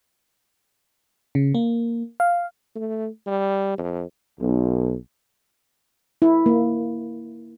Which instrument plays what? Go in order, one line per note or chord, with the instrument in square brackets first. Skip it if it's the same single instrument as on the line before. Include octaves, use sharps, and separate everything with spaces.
[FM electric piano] C#3
A#3
F5
[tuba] A3
G3
F2
[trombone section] B1
[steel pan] E4
A#3